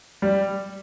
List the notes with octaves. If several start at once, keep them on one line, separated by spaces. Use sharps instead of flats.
G3